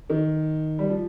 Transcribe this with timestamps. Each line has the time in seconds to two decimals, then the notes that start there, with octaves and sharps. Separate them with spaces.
0.10 D#3
0.79 G3
0.90 F3